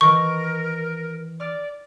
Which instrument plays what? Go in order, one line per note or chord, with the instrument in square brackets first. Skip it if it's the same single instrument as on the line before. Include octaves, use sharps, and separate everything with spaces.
[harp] D#3 E3 [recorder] A#4 [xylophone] C#6
[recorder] D5 [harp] D6 F6